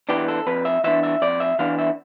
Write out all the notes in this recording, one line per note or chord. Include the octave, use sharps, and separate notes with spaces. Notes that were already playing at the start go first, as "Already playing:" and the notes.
E3 B3 D4 G4
A4
F2 B4
E5
E3 B3 D4 E5
E5
F2 D5
E5
E3 B3 D4 F5
E5